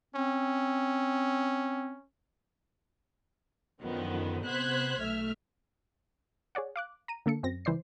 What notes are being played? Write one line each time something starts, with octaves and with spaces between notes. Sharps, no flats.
C4 C#4
F#2 D3 D#3 F3 B3
C3 B3 C5 F#6 G#6 B6
B1 A3 E5 F6
G#4 C#5 D5 F#5
F5 D6 F#6
A#5 D#7
D3 A#3 A4 C#7
F#2 C4 A#6
C#2 E3 C5 D5 C7